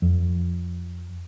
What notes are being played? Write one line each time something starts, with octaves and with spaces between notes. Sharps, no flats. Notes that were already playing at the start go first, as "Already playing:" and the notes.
F2